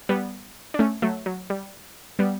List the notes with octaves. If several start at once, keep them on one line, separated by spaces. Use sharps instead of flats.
G3 B3
D4
A3 C#4
F#3 A3
F#3
G3
G3 B3